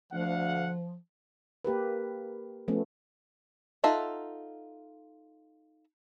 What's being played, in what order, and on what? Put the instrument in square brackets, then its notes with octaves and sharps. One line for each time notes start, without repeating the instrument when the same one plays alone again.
[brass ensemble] D2 F5 F#5 [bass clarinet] F3
[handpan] A#3 G4 A#4 B4
F3 A3 B3 C#4
[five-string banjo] D#4 F4 A4 E5 F#5